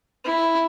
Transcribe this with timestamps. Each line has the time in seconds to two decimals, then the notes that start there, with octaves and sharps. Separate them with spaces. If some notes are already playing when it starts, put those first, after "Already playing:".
0.24 E4